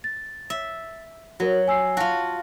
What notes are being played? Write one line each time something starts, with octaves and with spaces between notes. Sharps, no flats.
A6
E5
F#3 F#4 A#4
G#5 E6 C7
F4 F#4 F5 A5